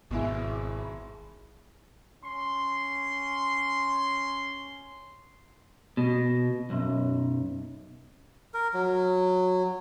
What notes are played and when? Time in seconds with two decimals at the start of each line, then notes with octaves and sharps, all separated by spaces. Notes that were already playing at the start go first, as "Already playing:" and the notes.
0.11 G#1 B2 G#3 E4
2.24 C#4 C6
5.97 B2
6.70 B1 F#2
8.54 A#4
8.74 F#3